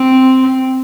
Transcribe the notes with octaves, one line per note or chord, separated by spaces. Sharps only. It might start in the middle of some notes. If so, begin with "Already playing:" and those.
Already playing: C4